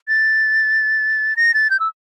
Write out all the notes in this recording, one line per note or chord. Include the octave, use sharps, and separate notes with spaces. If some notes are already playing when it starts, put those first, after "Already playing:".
A6
A#6
A6
G6
E6